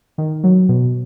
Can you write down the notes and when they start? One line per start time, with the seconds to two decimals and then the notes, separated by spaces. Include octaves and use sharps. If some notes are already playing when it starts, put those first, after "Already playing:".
0.18 D#3
0.44 F#3
0.69 B2